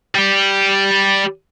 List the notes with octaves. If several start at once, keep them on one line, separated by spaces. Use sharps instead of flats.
G3 G4